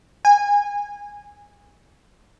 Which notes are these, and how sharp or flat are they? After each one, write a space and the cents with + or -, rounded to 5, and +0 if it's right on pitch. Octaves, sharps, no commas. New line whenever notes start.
G#5 -20